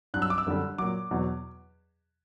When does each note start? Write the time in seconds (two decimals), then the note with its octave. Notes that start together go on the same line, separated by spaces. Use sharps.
0.14 G2 F#3 F#6
0.22 E6
0.30 D6
0.38 E6
0.46 F#2 D3 G3
0.78 A#2 F#3 D6
1.11 E2 B2 F#3